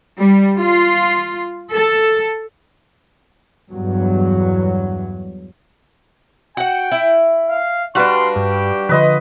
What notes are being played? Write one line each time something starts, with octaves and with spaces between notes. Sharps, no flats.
G3
F4
A4
E2 G2 F#3
F#4 F#5 G5
E4
F5
G3 D4 F#4 B4 F5 C6
G2 G4
D3 F3 B4 D#5 C6